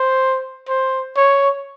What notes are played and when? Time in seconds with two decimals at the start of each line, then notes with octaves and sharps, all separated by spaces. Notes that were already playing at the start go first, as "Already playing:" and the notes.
Already playing: C5
0.68 C5
1.16 C#5